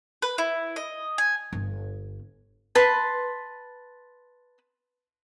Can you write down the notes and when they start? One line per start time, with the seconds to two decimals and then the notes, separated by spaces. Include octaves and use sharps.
0.22 B4
0.38 E4
0.76 D#5
1.18 G#5
1.53 G1
2.75 B4 A5 C6